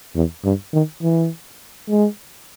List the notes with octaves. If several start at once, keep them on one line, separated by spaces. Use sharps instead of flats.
E2
G2
D#3
E3
G#3